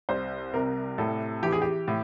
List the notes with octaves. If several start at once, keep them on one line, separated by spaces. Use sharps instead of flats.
C2 C5
C3 A#4
A2 A4
E3 G4
G#4
G4
A2